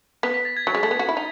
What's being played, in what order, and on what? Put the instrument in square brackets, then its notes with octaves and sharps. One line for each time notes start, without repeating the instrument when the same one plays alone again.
[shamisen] B3 [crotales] B6
[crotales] B6
A6
G#6
[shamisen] F#3
G#3
A3
B3
F#4
E4
D#4